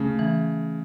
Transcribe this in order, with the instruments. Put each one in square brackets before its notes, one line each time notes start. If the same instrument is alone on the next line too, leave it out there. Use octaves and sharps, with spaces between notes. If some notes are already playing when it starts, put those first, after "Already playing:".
Already playing: [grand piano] C#3 [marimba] A3
[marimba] E3